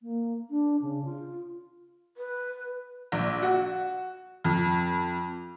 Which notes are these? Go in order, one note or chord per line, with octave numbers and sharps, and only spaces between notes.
A#3
D4
C#3
F4
B4
A#1
F#4
F2